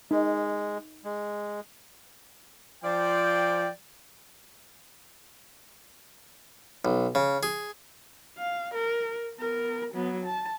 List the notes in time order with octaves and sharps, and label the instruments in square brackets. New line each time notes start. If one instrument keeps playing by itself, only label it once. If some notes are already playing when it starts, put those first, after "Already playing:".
[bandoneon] G#3 [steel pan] D#4
[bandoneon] G#3
[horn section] F3 D5 G5
[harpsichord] B1
C#3
G#4
[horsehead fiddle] F5
A#4
B3 A#4
F#3 B3
A5